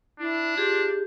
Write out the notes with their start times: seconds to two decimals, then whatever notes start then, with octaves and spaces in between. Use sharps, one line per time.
0.20 D4 E4
0.57 F4 G4 G#4